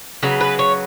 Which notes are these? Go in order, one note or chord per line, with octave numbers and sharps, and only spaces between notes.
C#3 F#3 B3
B4
C#5